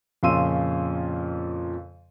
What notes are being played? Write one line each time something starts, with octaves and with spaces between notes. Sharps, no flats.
F2 A#2 C#3 C6 E6 D#7